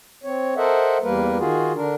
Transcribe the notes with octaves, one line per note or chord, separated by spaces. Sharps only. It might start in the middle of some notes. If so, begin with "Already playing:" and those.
C4 C#5
A4 A#4 C5 D#5 E5 F#5
E2 G3 A#3 A#4 B4
D#3 F4 F#4 G#4
D3 D4 A#4